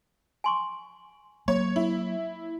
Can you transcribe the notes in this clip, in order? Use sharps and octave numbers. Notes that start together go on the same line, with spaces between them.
G#5 C6 C#6
F#3 A#3 C#5
E4